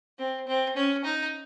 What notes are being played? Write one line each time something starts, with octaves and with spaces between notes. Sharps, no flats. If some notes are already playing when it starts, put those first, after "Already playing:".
C4
C4
C#4
D#4